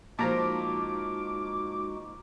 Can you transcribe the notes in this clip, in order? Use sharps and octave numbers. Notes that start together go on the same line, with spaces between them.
A#2 F3 G#3 D#4 F#4 A5 A#5 D6